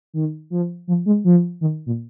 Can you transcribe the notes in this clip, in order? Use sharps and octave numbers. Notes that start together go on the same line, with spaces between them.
D#3
F3
F3
G#3
F3
D#3
A#2